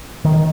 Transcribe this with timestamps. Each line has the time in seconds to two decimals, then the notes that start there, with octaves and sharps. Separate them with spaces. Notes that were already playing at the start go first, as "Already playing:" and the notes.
0.25 D#3